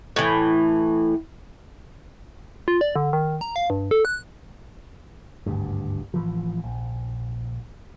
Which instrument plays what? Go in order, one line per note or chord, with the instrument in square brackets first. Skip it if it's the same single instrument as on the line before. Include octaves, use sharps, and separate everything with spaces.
[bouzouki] A2 E3
[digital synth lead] F4
D5
D3
D#3
A#5
F5
G2
A4
F#6
[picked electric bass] G#1 D2 G2
A1 E3 F3
A#1